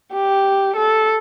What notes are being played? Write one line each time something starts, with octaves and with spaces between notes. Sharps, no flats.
G4
A4